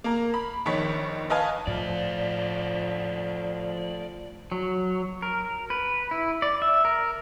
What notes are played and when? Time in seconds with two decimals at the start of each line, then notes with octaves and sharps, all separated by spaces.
0.04 A#3 A#5
0.34 B5
0.66 A#1 D#3 C#5 B6
1.30 B4 D#5 F5 G#5 A5
1.67 A2 F3 A3 D5
4.52 F#3
5.22 A#4
5.70 B4
6.11 E4
6.42 D5
6.62 E5
6.85 A#4